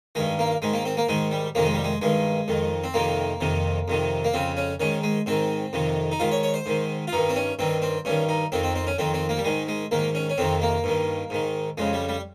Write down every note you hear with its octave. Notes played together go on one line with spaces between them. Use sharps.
G2 D#3 G#3
A#3
G#2 D#3 G#3
A#3
C4
A#3
G#2 D#3 G#3
G3
F2 C3 D#3 A#3
G#3
G3
G#3
G2 D#3 G#3
F2 D#3
C4
F2 C3 D#3 A#3
F2 C3 D#3
F2 C3 D#3
A#3
F2 C#3 C4
C#4
G#2 D#3 C#4
G#3
G#2 D#3 C4
F2 C3 D#3
D#4
G#2 D#3 F4
C#5
C#5
C5
G#2 D#3
F4
G2 D#3 D#4
C4
C#4
G2 D#3 C4
C4
G2 D#3 C#4
D#4
F2 D#3 C4
C4
C4
C#4
F2 D#3 C4
C4
A#3
G3
G#2 D#3 G#3
G#3
G#2 D#3 A#3
C#4
C#4
F2 C3 D#3 C4
A#3
G2 D#3
G#2 D#3
F2 C#3 G#3
G3
G3